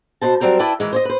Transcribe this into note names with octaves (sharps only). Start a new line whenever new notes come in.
B2 C5 A5
F#3 G3 C4 A#4 C5
E4 B4 D5 G5 A5
D#3 E3 G#3
C5 C#5 D#5
B4 C5